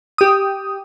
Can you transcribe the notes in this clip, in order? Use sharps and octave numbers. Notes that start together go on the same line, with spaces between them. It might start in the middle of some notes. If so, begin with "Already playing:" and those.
G4 D#6